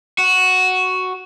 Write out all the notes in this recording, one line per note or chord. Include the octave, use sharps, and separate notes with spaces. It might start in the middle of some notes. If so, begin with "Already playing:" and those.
F#4